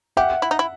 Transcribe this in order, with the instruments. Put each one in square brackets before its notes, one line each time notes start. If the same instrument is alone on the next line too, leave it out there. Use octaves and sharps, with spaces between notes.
[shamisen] G4 [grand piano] E5 F#5
[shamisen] E4
D#4
E4